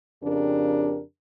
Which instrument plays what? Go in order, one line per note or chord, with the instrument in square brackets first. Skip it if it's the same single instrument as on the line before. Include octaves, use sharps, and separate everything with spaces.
[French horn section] F2 C#3 D4 G4 A#4